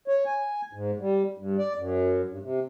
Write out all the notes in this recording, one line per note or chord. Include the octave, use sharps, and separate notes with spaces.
C#5
G#5
G#2
G3
G2
D5
F#2
G2
C3